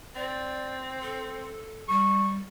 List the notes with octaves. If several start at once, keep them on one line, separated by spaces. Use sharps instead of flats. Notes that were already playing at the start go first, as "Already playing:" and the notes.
C4 D5
A4
G3 C#6